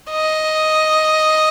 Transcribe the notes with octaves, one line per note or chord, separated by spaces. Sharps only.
D#5